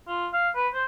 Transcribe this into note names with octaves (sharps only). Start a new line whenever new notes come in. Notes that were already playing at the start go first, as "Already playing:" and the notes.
F4
F5
B4
C5